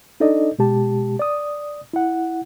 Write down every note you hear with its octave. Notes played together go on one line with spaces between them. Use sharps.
D4 D#4 A4 D5 D#5
B2 G#3 G4 A5
D5 D#6
E4 F#5